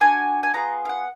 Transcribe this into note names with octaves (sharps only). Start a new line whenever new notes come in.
D4 F#4 G#5
G#5
B3 F4 G#4 A#5
F5
F#5